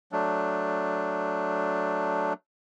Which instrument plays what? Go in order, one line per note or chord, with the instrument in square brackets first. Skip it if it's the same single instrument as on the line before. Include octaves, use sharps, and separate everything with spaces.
[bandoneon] F#3 A3 D4